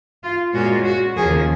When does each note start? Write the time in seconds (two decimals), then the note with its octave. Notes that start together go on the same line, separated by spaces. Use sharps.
0.23 F4
0.53 A#2 G#3 C#4 F4 F#4
0.84 F#4
1.16 D#2 C#3 F3 A#3 G#4